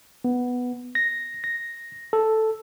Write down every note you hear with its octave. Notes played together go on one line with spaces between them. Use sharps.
B3
A#6
A#6
A4